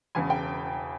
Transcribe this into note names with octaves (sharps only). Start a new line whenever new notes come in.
E1 E2 C#3 G#5
G5